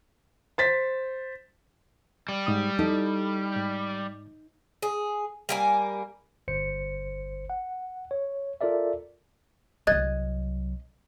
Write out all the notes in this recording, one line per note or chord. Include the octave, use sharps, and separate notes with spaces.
C5 A6 B6
G3
G#2 D#6
D#4 A4
G#2
G#4
G3 A#3 G#5
G1 C5 C#7
F#5
C#5
F4 A4 A#4 D5 E5
C2 F#3 D#5 F#6 G#6 A6